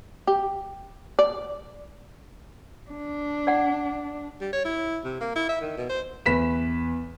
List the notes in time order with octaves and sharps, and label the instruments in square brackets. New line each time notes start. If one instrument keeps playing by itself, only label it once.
[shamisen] G4
D5
[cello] D4
[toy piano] D5 F#5
[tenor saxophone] G3
C#5
E4
C3
A#3
E4
E5
D#3
B2
C5
[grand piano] E2 B4 B6 E7